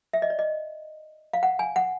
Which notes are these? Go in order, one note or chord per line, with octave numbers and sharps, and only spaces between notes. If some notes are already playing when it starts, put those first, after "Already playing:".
E5
D#5
D5
D#5
F5
F#5
G#5
F#5